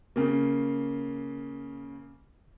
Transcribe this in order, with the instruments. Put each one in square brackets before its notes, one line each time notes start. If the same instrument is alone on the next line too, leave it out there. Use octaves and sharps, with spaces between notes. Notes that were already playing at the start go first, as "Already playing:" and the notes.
[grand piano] C#3 A#3